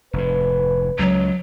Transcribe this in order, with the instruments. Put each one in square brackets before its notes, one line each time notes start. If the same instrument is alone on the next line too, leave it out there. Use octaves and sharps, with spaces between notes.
[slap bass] F1 G#2 [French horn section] B4
[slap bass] C#2 [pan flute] F#3